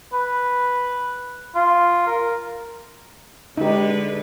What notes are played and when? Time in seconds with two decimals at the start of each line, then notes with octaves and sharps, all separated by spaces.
0.13 B4
1.55 F4
2.07 A#4
3.57 D3 G#3 D#4 G4 B4